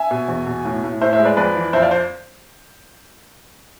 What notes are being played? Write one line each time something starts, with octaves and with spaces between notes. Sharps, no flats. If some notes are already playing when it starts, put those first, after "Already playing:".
Already playing: E5 G#5
B2
E2
B2
A2
A2
A2 C5 E5
C5 E5
G#3
B4 D5
F2 B4 D5
E3
F2 C5 E5
D5 F5
C5